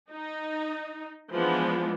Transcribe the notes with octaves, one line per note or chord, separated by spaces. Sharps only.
D#4
E3 F3 G#3 B3 D4